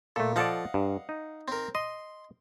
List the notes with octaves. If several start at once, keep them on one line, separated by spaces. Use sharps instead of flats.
A#2 A3 A4
F3 A4 D5 D#5 F5 F#5
G2
D#4
C4 A#4
D#5 C6